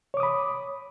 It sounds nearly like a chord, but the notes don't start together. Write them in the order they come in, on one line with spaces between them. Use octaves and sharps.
C#5 D6 D#6 B5